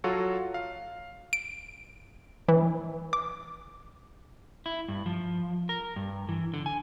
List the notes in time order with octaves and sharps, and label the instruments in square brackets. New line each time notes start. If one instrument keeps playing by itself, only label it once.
[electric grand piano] F#3 F4 F#4 A4 C#5
F5
[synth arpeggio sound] D7
E3
D6
[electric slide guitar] E4
G2
F3
A#4
G2
E3
D3
G#5